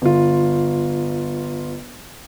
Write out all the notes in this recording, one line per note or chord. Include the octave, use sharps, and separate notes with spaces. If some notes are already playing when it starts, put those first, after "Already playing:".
G1 F4